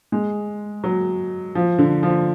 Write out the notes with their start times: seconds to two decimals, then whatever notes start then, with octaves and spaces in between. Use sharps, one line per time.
0.12 G#3
0.84 F#3
1.55 F3
1.78 D3
2.03 F3